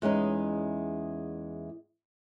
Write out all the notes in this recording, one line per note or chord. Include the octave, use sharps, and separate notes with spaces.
E2 G#3 C#4 D#4